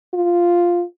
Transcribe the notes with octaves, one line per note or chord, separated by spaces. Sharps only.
F4